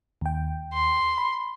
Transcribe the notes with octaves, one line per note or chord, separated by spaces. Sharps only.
D#2 G5
C6
B5